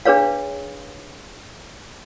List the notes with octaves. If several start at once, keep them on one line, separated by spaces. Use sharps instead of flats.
D4 G#4 B4 C#5 F5